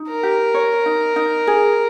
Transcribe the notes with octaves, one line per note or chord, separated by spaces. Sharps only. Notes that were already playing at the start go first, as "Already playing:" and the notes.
Already playing: D#4
A#4
G4
C#5
D#4
D#4
G#4